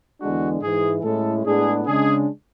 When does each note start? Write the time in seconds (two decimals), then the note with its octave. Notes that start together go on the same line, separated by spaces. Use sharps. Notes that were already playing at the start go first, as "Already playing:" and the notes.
0.20 E2 D3 G#3 D4 F#4
0.62 G#2 E3 G#3 G#4
1.03 A2 G#3 C#4 E4 A4
1.45 A2 G#3 B3 D4 G#4
1.86 C#3 G#3 D4 G#4